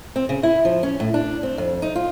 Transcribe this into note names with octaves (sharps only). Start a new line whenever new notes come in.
C4
C#3
E4
F3
C#4
A2
D4
C4
F2
D#4
F4